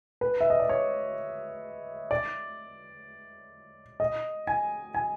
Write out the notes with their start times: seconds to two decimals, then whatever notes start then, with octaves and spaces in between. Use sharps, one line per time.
0.21 B4
0.40 E5
0.50 D#5
0.60 D5
0.69 C#5
2.11 D5
4.00 D#5
4.47 G#5
4.94 G#5